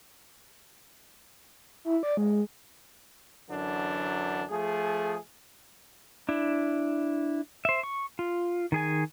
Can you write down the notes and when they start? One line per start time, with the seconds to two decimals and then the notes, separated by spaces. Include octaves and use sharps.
1.85 E4
2.03 D5
2.17 G#3
3.50 F#2 D3 E3 F#3 D4
4.49 F3 A3 G#4
6.29 D4 E4
7.65 C5 E5
7.83 C#6
8.19 F4
8.72 D#3 G#4 G#5